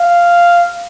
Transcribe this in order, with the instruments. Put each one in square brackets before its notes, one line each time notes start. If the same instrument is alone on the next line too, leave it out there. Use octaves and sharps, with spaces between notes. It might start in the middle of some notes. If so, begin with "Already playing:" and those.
Already playing: [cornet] F5